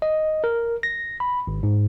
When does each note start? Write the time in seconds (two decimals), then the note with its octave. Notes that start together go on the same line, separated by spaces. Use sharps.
0.02 D#5
0.44 A#4
0.83 A#6
1.20 B5
1.47 G#1
1.63 G#2